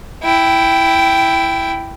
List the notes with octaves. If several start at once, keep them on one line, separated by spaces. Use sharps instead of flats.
E4 G5